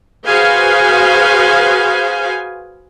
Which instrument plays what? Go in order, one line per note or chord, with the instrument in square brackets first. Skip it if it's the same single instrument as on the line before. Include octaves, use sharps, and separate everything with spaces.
[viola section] F#4 G#4 B4 C5 F5 G#5